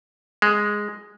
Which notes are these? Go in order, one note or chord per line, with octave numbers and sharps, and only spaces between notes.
G#3